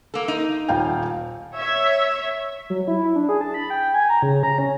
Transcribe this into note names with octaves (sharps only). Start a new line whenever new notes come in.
A#3 A4
D#4
D#1 F5 G5
C#5 E5
F#3
E4
D4
G#4
A5
B5
G5
G#5
A#5
C#3
A#5
C#4